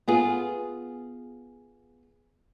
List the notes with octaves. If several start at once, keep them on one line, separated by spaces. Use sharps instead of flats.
B3 F4 G#4